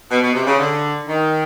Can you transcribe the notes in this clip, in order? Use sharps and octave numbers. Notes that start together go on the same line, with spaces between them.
B2
B2
C3
C#3
D3
D#3